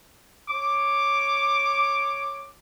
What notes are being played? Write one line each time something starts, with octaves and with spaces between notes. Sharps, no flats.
C#5 D6